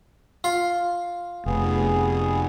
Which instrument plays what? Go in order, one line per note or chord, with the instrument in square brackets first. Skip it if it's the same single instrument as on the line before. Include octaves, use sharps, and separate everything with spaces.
[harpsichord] F4 F5
[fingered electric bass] F1 [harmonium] B3 G#4